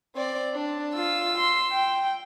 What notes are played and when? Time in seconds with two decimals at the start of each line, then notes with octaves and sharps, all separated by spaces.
0.15 C4 D5
0.54 D4
0.94 F4 E6
1.38 C6
1.73 G5